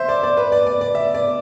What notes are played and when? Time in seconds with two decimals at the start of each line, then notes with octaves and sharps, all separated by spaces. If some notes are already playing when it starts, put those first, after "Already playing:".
Already playing: C5 E5
0.08 D5
0.23 D5
0.37 B4
0.52 D5
0.67 D5
0.81 D5
0.95 E5
1.14 D5